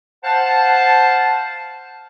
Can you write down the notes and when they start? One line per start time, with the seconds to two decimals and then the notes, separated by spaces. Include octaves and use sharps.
0.24 C5 F5 F#5 A5